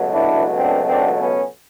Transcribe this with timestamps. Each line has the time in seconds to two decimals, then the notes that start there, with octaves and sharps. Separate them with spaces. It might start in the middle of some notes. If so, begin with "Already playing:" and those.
Already playing: C#2 B2 F#3 A3
0.10 D4 E4
0.56 C4 D4
0.86 C4 D4
1.17 B3 C#4